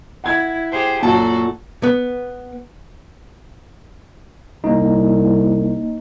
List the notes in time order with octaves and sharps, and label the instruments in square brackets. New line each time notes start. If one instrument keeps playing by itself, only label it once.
[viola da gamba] E4 [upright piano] F#5 G#6
[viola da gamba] G4 G#4 C5
[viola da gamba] F#2 F#4 A4 [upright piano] A#2 A5
[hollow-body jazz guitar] B3
[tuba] C2 [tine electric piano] A#3 D#4